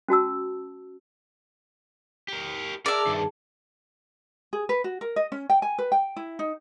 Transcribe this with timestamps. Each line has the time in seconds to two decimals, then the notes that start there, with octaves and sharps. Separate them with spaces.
0.08 C#4 F#4 A5 E6
2.28 G4 A#4
2.86 G#4 A#4 D5 E5 A5
3.06 G2 D#3
4.53 G#4
4.69 B4
4.84 F#4
5.01 A#4
5.16 D#5
5.32 C#4
5.50 G5
5.62 G#5
5.78 B4
5.92 G5
6.16 E4
6.39 D#4